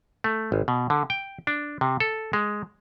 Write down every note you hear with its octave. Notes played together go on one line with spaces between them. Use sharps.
A3
G#1
B2
D3
G5
D4
C3
A4
G#3